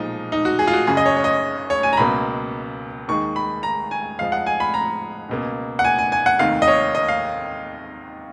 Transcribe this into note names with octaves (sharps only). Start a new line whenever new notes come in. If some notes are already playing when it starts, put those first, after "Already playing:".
Already playing: B1 A#2 F3 G#3 D#4
D#4
F#4
G#4
F4
F#4
F#1 F#2 C#3 G#4
D#5
C#5
C#5
D#5
C#5
G#5
A#5
C#2 B2 F#3 A#3 B5
D#2 D#3 G#3 C#6
B5
A#5
G#5
F2 F3 G#3 F5
F#5
G#5
B5
A#5
C#2 B2 A#3
F#5
G#5
G#5
G#5
F#5
F1 D#2 D#3 F5
D#5
C#5
D#5
F5